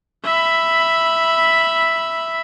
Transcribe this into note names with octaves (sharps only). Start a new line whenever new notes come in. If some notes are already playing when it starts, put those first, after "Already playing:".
E5 B5